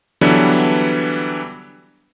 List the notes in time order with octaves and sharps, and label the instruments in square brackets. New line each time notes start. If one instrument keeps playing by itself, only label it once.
[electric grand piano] D3 E3 F#3 G3 B3 D4